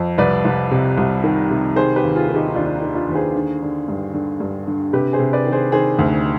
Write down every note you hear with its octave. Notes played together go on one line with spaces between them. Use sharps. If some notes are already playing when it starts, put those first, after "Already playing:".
Already playing: F2
C2 B4 D5
C2
C3
C2
D#3
C3
D#3 G#4 C5
G4 B4
D#2
F4 G#4
D#3
D#4 G4
D#4
D#2 D4 F4
D4
D#4
D#3
D4 F4
D#2 B4
G#4 C5
D3
D3
G2
D3
G2
D3
C3 G4 B4
G#4 C5
C3
B4 D5
D#3
G#4 C5
D#3 G#4 C5
D2